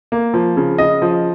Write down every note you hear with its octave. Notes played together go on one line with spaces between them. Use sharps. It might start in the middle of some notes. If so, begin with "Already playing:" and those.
A#3
F3
C#3
C#3 D#5
F3